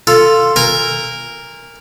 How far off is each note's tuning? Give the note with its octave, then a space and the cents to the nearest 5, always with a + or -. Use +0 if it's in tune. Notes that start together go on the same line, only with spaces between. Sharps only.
F4 +0 A4 +10
A#4 +0 G#5 -30